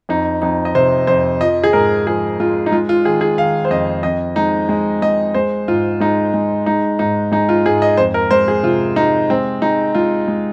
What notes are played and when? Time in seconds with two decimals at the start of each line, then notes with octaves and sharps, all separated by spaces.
0.09 F2 D#4
0.42 F2 D#4
0.65 D#5
0.75 C3 C5
1.07 F2 C5
1.41 F3 D#5
1.64 G#4
1.73 G#2 A#4
2.07 F3 G#4
2.40 G#3 F4
2.66 D#4
2.72 G#3 F4
2.89 F4
3.05 D#3 G#4
3.21 G#4
3.38 D#3 F5
3.65 C5
3.70 F2 D#5
4.03 F2 D#5
4.36 G#3 D#4
4.69 G#3
5.02 G#3 D#5
5.34 G#3 C5
5.68 G#2 F4
6.00 G#3 D#4
6.34 G#3
6.66 G#3 D#4
6.99 G#2 D#4
7.32 G#3 D#4
7.49 F4
7.65 G#2 G#4
7.82 D#5
7.97 F2 C5
8.14 A#4
8.31 G#3 C5
8.48 G#4
8.63 C3 F4
8.96 G#3 D#4
9.30 G#3 C4
9.62 G#3 D#4
9.95 G#3 F4
10.28 G#3